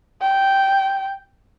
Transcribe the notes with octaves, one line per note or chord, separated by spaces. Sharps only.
G5